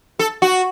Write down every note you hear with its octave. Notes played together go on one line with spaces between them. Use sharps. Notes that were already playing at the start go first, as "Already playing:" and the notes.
A4
F#4